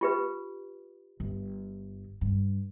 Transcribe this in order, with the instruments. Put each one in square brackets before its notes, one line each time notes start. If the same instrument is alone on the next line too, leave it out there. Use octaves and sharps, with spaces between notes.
[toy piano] F4 G4 B4
[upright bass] G1
G2